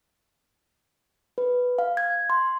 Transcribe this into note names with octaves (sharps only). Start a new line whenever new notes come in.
B4
F5
G#6
C6